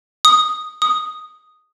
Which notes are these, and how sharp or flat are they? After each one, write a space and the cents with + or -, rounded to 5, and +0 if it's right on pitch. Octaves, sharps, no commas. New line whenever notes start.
D#6 -5
D#6 -5